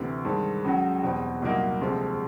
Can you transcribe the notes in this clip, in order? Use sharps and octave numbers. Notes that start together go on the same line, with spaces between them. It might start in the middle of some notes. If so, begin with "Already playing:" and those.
Already playing: D2 C3 E3
G2 D#3 G#3 C4
C#2 C#3 F#3
E2 B2 G3 C4
C2 A#2 F#3 A#3 D#4
D2 C3 F3 G#3 C4